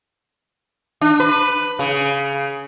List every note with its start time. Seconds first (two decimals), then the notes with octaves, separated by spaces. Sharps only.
1.01 D4
1.20 B4
1.79 C#3